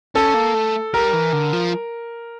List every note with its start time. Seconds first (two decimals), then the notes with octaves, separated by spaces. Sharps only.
0.15 C#4 A4
0.34 A#3
0.55 A3
0.94 G3 A#4
1.13 E3
1.33 D3
1.53 F3